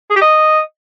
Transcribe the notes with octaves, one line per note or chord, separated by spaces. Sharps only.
G#4
G4
D#5